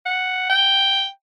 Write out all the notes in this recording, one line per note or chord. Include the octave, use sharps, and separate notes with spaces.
F#5
G5